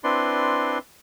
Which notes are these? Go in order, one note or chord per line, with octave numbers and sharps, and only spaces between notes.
C4 D4 E4 B4 D5 C6